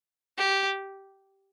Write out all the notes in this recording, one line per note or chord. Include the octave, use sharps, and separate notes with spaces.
G4